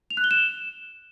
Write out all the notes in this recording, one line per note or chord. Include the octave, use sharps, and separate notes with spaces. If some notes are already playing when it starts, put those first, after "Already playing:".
F7
F#6
G7
E7